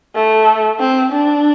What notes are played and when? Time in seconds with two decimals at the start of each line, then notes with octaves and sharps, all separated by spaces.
0.15 A3
0.79 C4
1.12 D4